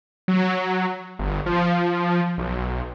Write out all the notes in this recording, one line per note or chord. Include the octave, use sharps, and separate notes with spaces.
F#3
G1
F3
B1